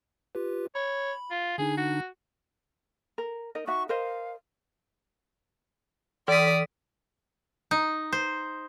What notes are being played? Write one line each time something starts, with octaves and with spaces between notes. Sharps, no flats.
F4 G4 B4
C#5 B5
F4
D3 D4 D#4 G#4
F#4
A#4
D#4 A#4 D#5
D#4 F#4 E5 C#6
A#4 C5 D#5 F5
E3 D5 D#6 B6
D#4
C5